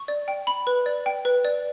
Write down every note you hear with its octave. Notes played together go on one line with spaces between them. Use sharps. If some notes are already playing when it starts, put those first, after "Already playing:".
Already playing: C#6
D5
G5
B5
B4
D5
G5
B4
D5